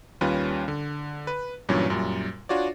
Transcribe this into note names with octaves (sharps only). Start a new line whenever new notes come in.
D#2 G3 C#4 F4 B4
D3
B4
G2 A#2 E3 F#3 C#4
F#2 A#2 G3
D4 F4 F#4 C#5 D5